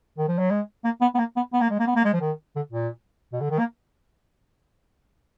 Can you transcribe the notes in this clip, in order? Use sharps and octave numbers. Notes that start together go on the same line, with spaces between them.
D#3
F3
F#3
G#3
A#3
B3
B3
A#3
B3
B3
A#3
G#3
A#3
B3
A#3
G#3
F3
D#3
D3
A#2
B2
D3
D#3
A#3